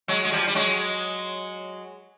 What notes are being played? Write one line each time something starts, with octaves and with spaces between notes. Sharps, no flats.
F#3 G#3
G#3
F3 G3
G3
F#3 G#3